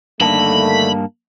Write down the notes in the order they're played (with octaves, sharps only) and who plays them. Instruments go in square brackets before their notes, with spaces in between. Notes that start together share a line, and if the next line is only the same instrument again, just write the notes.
[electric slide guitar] G2 A#3 A5 [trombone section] D3 D#3 A3 [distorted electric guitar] B5